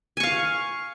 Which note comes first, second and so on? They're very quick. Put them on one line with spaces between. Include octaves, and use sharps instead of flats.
G#5 C#6 F5